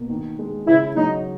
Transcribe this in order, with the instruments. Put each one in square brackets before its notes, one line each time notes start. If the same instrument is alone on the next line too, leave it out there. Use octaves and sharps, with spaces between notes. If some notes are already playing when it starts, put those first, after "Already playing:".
Already playing: [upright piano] B2 A#3
D#3
G#3
[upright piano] C#3 [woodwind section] E4
[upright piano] F#3 [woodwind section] D#4